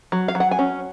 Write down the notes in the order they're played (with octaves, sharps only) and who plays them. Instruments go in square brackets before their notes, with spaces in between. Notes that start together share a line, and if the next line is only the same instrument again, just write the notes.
[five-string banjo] F#3
F5
F#3
F#5
G#5
C#4